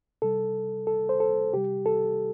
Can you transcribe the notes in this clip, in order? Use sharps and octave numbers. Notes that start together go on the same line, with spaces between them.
C3 G3 A4
A4
C5
A4
C3 G3 G4
A4